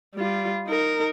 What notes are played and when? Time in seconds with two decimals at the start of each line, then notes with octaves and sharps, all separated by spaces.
0.15 G3 F4
0.67 D#4 A#4